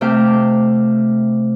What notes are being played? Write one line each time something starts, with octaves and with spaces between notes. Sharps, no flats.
C3 A3 E5 F5 G5 D6